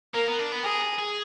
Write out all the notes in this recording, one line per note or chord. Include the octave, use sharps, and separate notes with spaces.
A#3 A#4
B3
D4
B3
G#4 A#4
G#4